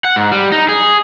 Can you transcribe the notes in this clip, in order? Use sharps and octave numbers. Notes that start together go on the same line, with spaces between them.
F#5
G#2
G3
D#4
G#4